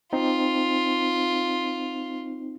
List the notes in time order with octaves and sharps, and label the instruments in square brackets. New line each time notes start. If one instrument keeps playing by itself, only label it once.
[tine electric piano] C4 D#4 [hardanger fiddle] F4